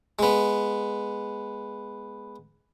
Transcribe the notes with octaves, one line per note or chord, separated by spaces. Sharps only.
G#3 B3